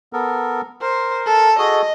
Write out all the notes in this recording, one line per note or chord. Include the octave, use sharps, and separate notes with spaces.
B3 A4 A#4
A#4 C5
A4
F#4 G#4 A4 D#5